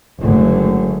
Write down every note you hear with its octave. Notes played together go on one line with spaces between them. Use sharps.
F#1 F#2 D3 F#3 G#3 A3